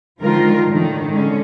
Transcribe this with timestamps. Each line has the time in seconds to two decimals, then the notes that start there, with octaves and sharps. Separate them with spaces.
0.21 D3 D#3 F3 G#3 F4 A#4
0.67 A2 D3 D#3
1.10 D3 G#3 C#4